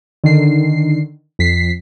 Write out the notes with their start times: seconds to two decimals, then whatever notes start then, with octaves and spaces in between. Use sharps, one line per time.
0.24 D3 D#3 C7
1.39 F2 B6 C7